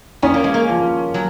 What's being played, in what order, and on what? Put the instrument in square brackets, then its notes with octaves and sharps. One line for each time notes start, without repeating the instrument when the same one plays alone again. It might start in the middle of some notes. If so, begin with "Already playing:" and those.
[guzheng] B3 [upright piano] C#4
[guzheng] A#3
G#3
A#3
[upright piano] F3
[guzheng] F#3